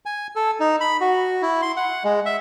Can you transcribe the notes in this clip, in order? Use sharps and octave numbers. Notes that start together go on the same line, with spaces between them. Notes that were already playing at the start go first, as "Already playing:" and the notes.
G#5
A4
D#4
B5
F#4
E4
C6
F#5
G#3
E5